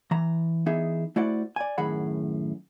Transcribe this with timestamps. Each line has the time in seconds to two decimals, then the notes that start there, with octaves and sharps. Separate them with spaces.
0.11 E3 A#5
0.66 E3 B3 D#4 G#4 E5
1.16 A3 E4 F#4 C5 D5 F#5
1.56 D5 G#5
1.78 F#2 A2 D#3 G#4 F#5 B5